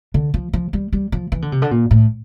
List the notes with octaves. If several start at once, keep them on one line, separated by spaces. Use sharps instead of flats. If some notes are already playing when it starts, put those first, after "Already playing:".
D3
F3
F3
G3
G3
F3
E3
D3
C3
D3
A#2
A2